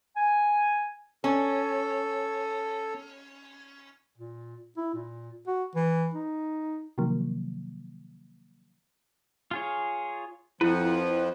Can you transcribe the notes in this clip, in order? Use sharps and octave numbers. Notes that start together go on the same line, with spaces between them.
G#5
C#4 A4
A#2
E4
A#2
F#4
E3
D#4
C3 D#3 F3 F#3 A#3
F4 G#4 C#5
F2 F3 E4 B4 F#5